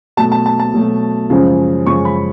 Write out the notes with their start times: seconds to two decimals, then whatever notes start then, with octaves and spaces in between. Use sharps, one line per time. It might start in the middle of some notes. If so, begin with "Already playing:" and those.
0.17 B2 F#3 A3 A5
0.32 A5
0.46 A5
0.60 A5
0.74 B2 F#3 A3
1.30 F#2 C#3 F3 G#3 C#4
1.86 F#2 C#3 F3 G#3 C#4 C#6
2.05 B5